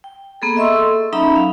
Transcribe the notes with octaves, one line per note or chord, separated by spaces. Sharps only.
G5
A#3 B3 G#4 A4
D#5 E5 C6 C#6 E6
A4
F#3 C#4 D#4 E5 A#5 B5
F5